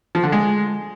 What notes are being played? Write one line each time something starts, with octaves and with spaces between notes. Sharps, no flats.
F3
D3
G#3